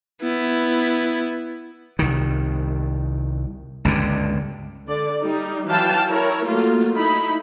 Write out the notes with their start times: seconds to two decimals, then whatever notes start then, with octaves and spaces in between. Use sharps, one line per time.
0.22 B3 E4
1.99 C2 D#3
3.85 C#2 G2 D3
4.87 D3 D5
5.22 G3 D#4
5.68 E3 F#3 F5 G5 A5
6.07 E4 A#4 C#5
6.47 F#3 A3 A#3 F4
6.95 D#4 E4 B5